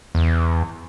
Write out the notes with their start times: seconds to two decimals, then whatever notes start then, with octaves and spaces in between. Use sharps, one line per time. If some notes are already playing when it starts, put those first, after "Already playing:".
0.15 E2